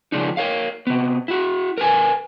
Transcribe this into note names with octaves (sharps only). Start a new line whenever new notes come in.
C#3 F3 G#3 D4 D#4
A#4 C#5 F5
C3 B3
E4 F#4
A#4 B4 G#5